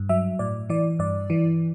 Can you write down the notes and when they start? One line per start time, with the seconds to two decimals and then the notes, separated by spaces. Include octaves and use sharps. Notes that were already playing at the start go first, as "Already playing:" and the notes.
Already playing: G2
0.09 F#3 E5
0.39 A2 D5
0.70 E3 D5
0.99 G2 D5
1.30 E3